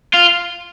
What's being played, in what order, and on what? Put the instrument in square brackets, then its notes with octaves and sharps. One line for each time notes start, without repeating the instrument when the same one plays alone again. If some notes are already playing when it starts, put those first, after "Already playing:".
[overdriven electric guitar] F4